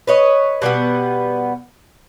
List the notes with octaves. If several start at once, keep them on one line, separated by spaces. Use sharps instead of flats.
B4 C#5 D#5
B2 G3 A3 B3